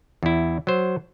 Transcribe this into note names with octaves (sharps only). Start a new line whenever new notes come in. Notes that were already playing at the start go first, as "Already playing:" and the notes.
E2 E4
F#3 C5